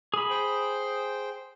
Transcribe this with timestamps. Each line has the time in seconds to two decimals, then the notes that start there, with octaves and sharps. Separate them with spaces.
0.14 G#4 B5
0.30 C5 G5